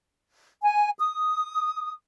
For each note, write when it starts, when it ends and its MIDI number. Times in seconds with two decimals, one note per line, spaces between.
0.61 0.89 80
0.99 1.91 87